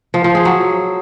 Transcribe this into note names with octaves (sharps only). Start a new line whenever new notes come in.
F3
F3
G#4
F#3